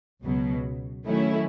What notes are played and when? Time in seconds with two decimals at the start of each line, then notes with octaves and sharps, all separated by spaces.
0.23 C#2 B2 F#3
1.06 D#3 F#3 A3 C#4 E4